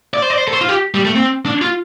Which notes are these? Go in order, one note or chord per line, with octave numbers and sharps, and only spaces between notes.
D5
C5
D5
C5
A4
C5
F4
G4
G3
A3
C4
D4
F4